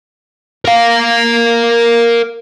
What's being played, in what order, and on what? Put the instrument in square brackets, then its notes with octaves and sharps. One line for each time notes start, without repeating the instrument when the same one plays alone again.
[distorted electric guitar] A#4 F5